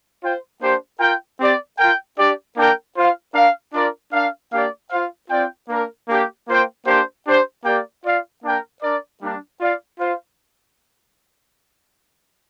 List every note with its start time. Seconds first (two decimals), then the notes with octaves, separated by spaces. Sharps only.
0.21 F4 C5 G5
0.61 A#3 D4 G4 C5
1.00 F4 A#4 G5
1.40 C4 G4 D5
1.78 F4 A#4 G5
2.17 D4 G4 D5
2.56 A#3 D4 A#4 G5
2.96 F4 C5 F5
3.34 D4 A#4 F5
3.74 D4 F4 A#4 D5
4.13 D4 A#4 F5
4.52 A#3 D4 G4 D5 F5
4.91 F4 C5 F5
5.30 C4 F4 D5 G5
5.69 A#3 D4 A#4
6.09 A#3 D4 G4
6.48 A#3 F4 C5 G5
6.86 A#3 D4 G4 C5
7.26 D4 G4 C5
7.65 A#3 G4 A#4 D5 G5
8.04 F4 D5 F5
8.43 A#3 D4 A#4 G5
8.82 D4 A#4 D5
9.21 G3 A#3 D4
9.60 F4 D5 F5
9.99 F4 C5 F5